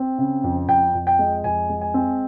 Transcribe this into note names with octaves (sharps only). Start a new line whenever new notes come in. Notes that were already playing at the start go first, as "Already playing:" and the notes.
Already playing: C4
C#3
F2
F2 G5
F2
G5
G#3
F2 G#5
G#3
G#5
C4